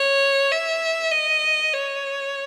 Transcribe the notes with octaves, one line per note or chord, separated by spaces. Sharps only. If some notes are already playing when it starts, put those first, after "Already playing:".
Already playing: C#5
E5
D#5
C#5